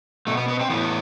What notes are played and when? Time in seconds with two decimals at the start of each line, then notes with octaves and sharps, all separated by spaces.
0.27 B2 A3
0.37 B3
0.48 B3
0.59 C4
0.70 A2 E3 B3